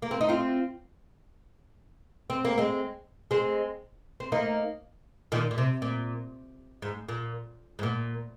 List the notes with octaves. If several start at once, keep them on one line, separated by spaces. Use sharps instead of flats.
A#3
C4
D#4
C4 F4
C4
A#3
G#3 C4
G#3 C4
C4
A#3 D#4
A#2 D#3
A#2
C3
A#2
G#2
A#2
G#2
A#2